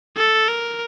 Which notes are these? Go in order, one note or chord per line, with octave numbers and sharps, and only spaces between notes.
A4
A#4